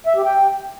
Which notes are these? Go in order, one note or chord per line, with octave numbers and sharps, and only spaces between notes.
E5
G4
G5